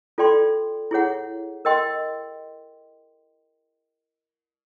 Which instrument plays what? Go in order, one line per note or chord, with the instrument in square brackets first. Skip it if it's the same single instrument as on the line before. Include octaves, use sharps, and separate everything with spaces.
[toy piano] F4 A4 D5 G5 C6
E4 G#4 C#5 F#5
A#4 D#5 G5 C6